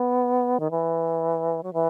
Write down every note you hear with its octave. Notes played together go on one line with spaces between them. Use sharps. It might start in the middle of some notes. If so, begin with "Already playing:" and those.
Already playing: B3
D#3
E3
F#3
E3